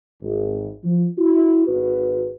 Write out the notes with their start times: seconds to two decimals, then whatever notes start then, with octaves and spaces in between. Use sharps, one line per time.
0.21 G#1
0.83 F3
1.18 E4 F#4
1.66 G#1 F#4 B4